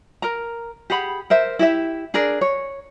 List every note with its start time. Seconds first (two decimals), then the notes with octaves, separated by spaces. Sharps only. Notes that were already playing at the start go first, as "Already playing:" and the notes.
0.22 A#4 A#5
0.90 G4 G#4 F#5 B5
1.30 A#4 C5 E5
1.59 E4 G4 E5
2.14 D4 G#4 A#4 D5
2.41 C#5